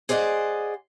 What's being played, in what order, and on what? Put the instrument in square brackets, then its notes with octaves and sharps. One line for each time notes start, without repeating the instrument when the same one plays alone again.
[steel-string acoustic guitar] G#4 C5 D5 D#5 F#5